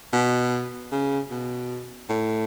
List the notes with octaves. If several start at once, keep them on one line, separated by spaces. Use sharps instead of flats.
B2
C#3
B2
A2